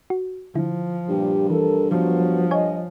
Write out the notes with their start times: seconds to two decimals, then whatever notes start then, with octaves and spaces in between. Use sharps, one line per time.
0.10 F#4
0.55 D3 F3 E4
1.09 G2 A#2 G4
1.50 E3 A4 A#4
1.91 F3 F#3 B3 F#4
2.51 C#5 D#5 G#5